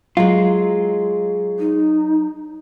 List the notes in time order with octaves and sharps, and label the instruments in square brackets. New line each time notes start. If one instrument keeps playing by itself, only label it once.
[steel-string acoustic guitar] F#3 [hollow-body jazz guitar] G#3 F4
[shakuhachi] D#4